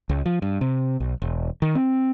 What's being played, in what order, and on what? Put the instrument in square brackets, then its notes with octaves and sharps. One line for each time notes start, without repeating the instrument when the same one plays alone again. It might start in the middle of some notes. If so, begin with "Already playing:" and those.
[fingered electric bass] C#2
F3
G2
C3
B1
E1
D#3
C4